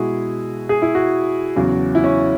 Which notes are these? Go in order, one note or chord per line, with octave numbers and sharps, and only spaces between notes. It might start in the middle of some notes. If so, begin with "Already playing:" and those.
Already playing: B2 G#3 E4 F#4 G#4
G#4
E4
F#4
E2 C#3 F#3
E4
C#4